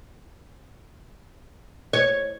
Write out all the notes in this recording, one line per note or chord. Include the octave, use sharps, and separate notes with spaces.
C#5